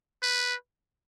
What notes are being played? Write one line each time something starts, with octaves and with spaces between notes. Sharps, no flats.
B4